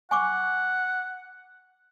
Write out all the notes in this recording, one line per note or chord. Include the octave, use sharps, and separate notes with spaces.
F#5 G#5 C#6 D6